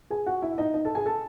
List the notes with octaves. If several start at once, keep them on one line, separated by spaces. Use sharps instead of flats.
G#4 G#5
F#4 F#5
E4 E5
E5
D#4 D#5
D#4 D#5
A4 A5
G#4 G#5
A4 A5